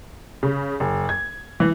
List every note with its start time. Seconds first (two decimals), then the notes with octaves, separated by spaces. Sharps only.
0.43 C#3
0.80 F#1
1.09 G#6
1.60 E3